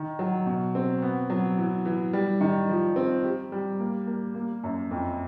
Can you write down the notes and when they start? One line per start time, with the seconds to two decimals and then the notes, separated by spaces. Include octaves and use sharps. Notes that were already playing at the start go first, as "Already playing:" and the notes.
Already playing: D#3
0.19 F#3
0.46 B2
0.75 C4
1.02 B3
1.30 F#3
1.58 E3
1.85 E3
2.13 G3
2.41 D#3
2.69 F3
2.96 C4
3.24 G4
3.52 G3
3.80 A#3
4.07 A#3
4.35 A#3
4.64 F#2
4.91 F2